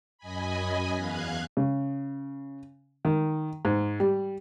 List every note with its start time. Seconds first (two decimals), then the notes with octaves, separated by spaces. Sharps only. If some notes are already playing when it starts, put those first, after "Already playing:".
0.18 F#2 D#5 G#5 B5
0.95 E2 F5 F#6 G#6
1.57 C#3
3.05 D#3
3.65 G#2
4.00 G3